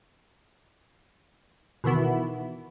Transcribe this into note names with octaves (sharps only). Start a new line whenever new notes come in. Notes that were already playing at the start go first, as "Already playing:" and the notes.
B2 D#3 E3 B3 E4